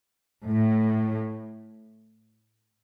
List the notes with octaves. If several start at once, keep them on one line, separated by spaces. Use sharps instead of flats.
A2